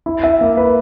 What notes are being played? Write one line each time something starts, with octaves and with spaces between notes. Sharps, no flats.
E4
E5
A#3
B4